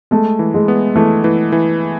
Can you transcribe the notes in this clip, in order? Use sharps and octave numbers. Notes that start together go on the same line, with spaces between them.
G#3 A3
E3
G#3
B3
E3 A3
E3
E3